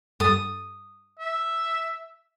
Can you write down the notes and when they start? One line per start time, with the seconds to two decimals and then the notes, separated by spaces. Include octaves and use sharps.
0.20 G2 A4 D#6 A6
1.19 E5